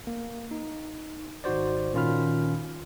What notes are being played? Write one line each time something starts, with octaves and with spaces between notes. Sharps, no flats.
A#3
D#4
G#1 D#4 F#4 C5 D5
A#2 D#3 C#4 F4 B5 F6